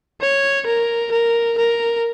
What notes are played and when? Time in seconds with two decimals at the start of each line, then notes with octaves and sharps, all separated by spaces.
0.21 C#5
0.66 A#4
1.12 A#4
1.58 A#4